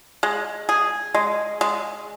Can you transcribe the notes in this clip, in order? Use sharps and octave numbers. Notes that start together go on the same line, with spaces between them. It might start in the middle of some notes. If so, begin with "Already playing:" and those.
G#3
G#4
G#3
G#3